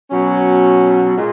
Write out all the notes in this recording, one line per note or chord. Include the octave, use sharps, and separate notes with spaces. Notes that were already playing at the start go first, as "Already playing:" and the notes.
B2 F#3 C#4
A#2 G#3